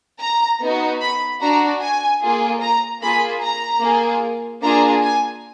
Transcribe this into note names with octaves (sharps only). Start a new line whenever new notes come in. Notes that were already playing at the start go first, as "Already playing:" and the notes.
A#5
B3 D#4 F#4
B5
D4 F#4 A#5
G#5
A#3 F4 G#4
A#5
A#3 F4 G#4 B5
A#5
A#3 F4 G#4
A#3 D4 F4 G#4 A#5
G#5